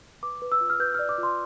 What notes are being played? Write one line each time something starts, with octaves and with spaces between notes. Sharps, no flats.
B4 D6
B4
E6
F4
F6
B4 G6
D5 F6
D6
F4
C6